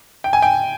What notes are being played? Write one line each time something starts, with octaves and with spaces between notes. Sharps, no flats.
G5
G#5
G5